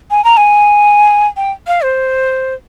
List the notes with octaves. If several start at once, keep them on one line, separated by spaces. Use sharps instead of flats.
G#5
A#5
G#5
G5
F5
C5